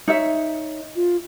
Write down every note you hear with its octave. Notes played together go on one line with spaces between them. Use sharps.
D#4 C#5 E5
F4